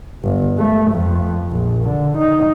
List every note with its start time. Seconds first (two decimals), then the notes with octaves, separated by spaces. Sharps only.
0.24 G1
0.58 A3
0.91 F2
1.51 A#1
1.84 D3
2.18 D#4